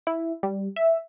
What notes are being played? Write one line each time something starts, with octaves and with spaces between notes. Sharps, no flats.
E4
G3
E5